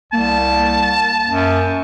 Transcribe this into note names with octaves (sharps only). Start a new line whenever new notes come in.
C2 A#3 A5
F#2